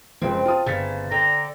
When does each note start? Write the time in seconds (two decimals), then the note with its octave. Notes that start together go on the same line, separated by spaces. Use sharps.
0.22 F#1 C#2 F3 C4
0.46 F4 A5 D#6
0.66 G1 C#3 A6 B6
1.11 D3 G5 A#5